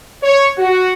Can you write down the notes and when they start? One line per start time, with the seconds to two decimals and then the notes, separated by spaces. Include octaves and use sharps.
0.23 C#5
0.58 F#4